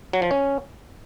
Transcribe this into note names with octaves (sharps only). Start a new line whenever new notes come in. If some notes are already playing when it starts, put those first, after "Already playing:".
F#3
F3
C#4